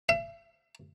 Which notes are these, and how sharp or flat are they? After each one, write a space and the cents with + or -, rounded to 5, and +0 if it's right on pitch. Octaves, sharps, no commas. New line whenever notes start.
E5 +40